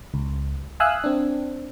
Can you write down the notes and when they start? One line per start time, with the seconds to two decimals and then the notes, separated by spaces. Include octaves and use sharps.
0.14 C#2
0.80 E5 F5 G#5 D#6 E6 F#6
1.04 C4 D4